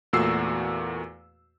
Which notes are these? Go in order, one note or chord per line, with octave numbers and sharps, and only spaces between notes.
E2 A#2 A3 F#4 E6 C7